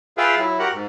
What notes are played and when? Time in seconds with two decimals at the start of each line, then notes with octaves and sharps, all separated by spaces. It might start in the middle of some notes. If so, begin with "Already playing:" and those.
0.18 F4 G#4 B4 E5 F5 G5
0.38 F#3 E4
0.59 F#4 G4 A#4 F#5
0.73 G#2